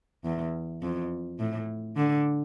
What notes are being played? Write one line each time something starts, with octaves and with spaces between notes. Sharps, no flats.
E2
F2
A2
D3